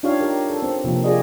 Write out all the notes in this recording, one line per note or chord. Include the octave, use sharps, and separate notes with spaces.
D4 D#4 F4 G4 C#5 F5
G4 A#4
A4
C4
C3 F3 A#3
F4 G4 G#4 D5 D#5